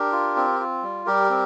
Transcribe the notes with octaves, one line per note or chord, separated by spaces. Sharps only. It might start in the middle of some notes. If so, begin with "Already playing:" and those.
Already playing: D4 G4 A#4
F4
C4
F4
G3
G3 G4 A#4
C4